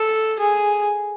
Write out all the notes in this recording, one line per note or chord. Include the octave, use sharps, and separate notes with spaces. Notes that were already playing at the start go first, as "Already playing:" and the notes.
Already playing: A4
G#4